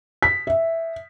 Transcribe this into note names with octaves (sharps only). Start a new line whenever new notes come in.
B6
E5